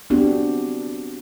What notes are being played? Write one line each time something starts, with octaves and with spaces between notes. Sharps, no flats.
B3 C4 D4 F#4 G4